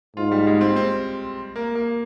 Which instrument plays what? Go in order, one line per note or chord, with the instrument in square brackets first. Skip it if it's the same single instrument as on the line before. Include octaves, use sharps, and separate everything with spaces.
[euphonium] G#2 [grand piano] F4
[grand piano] G3
G#3
C4
C4
A#3
A#3